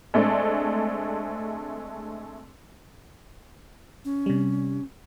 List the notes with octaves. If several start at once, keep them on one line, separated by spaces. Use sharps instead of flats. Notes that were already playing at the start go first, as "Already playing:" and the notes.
G#3 A3 C4 D4
C#4
C3 G3